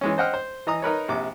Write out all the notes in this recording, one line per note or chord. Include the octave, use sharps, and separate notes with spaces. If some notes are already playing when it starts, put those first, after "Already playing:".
E3 G#3 C#4
C5 D#5 F#5 G5 F6
C5
E3 D#5 A#5 D#6
D#4 A#4 B4 C#5
A#1 C3 D6